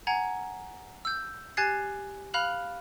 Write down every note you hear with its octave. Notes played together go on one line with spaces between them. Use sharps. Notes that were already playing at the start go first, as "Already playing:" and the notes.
F#5 G#5 A#5 G#6
E6 G6
G4 G#5 F#6 G#6 A6 C7
F5 B5 F6 F#6 F7 F#7